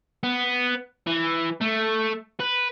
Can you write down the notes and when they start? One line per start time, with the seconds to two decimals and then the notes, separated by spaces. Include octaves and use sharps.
0.23 B3
1.07 E3
1.61 A3
2.40 B4